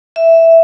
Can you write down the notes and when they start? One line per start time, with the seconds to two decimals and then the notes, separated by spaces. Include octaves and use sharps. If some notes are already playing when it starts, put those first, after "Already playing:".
0.16 E5